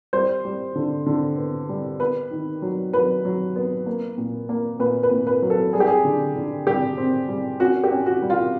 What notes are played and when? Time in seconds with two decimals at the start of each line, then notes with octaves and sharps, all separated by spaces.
0.13 G3 C5
0.45 G3
0.75 D3
1.06 D3
1.37 B3
1.69 G3
2.00 B3 B4
2.31 D#3
2.62 F#3
2.93 F#3 B4
3.25 F#3
3.56 B3
3.86 A#3
4.18 A#2
4.49 A#3
4.79 A#2 B4
5.03 B4
5.11 A#2
5.27 B4
5.42 F#3
5.50 A4
5.73 G3 G#4
5.80 G4
5.88 G#4
6.05 D3
6.36 D3
6.67 G3 G4
6.98 C4
7.29 G3
7.60 C#4 F#4
7.84 G4
7.91 C#4
8.06 F#4
8.22 G3
8.30 F4